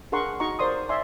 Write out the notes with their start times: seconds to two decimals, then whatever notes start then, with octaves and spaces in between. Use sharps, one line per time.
0.12 D4 G#4 A#4 F#5 C6 C#6
0.40 D#4 F#4 D#5 A#5 C#6
0.59 A#4 C5 D5 C6 D#6
0.89 D5 E5 G#5 C6